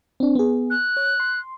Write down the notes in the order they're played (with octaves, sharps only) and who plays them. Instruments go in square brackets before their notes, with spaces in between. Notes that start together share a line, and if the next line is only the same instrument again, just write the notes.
[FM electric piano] C4 D4
B3 G#4
[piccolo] F#6
[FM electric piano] C#5
C6